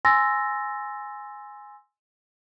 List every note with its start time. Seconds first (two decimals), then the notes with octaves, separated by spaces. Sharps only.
0.05 G#5 C6 E6 A6 A#6